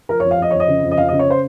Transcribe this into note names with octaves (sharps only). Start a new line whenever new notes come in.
F3 A#4
C#5
F2
F5
F2 D#5
F2 C#5
D#5
C#3
F2
D#5
F2 F5
D#5
C#3
C#5
C5